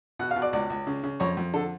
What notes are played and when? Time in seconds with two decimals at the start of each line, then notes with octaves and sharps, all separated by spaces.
0.19 B2 F#5
0.31 F5
0.36 B2
0.42 D5
0.53 C#2 D5
0.70 C#2
0.87 C#3
1.03 C#3
1.20 F2 C#5
1.37 F2
1.54 D3 A4